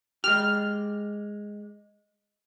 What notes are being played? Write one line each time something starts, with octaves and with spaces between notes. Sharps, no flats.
G#3 G4 F6